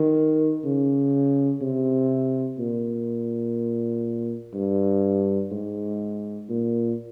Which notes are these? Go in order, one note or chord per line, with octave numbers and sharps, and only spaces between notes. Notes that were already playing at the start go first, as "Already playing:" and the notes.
Already playing: D#3
C#3
C3
A#2
G2
G#2
A#2